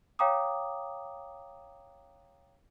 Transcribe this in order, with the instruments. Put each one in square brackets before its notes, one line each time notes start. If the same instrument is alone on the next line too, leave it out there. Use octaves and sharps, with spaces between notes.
[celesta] C#5 F5 G5 A#5 D6 D#6